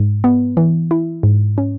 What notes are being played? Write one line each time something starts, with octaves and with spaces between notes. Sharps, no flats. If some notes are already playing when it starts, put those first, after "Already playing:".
Already playing: G#2
B3
E3
E4
G#2
C#4